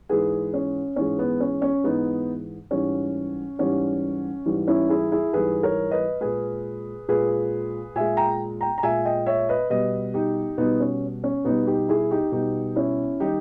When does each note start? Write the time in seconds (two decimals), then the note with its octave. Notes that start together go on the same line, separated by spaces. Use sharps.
0.09 G#2 E3 G#3 G#4 B4
0.54 C#4
0.96 G#2 E3 G#3 C#4
1.19 B3
1.40 C#4
1.62 C#4
1.84 G#2 E3 G#3 B3 D#4
2.71 G#2 E3 G3 C#4
3.58 G#2 E3 G3 C#4
4.46 G#2 E3 G3
4.67 C#4 E4
4.89 E4 G#4
5.12 E4 G#4
5.33 G#2 E3 G3 G#4 B4
5.63 A#4 C#5
5.91 B4 D#5
6.21 A#2 G#3 G#4 B4
7.08 A#2 G#3 G#4 B4
7.96 A#2 G#3 E5 G#5
8.17 G5 A#5
8.61 G5 A#5
8.78 A#5
8.83 A#2 G#3 E5 G#5
9.05 D#5 G5
9.26 C#5 E5
9.49 B4 D#5
9.70 B2 G3 B4 D#5
10.14 D#4 G4
10.58 B2 G3 B3 D#4
10.80 C#4
11.24 C#4
11.45 B2 G3 B3 D#4
11.66 D#4 G4
11.88 E4 G#4
12.11 D#4 G4
12.32 B2 G3 D#4 G4
12.76 C#4 E4
13.20 D#3 G3 D#4 G4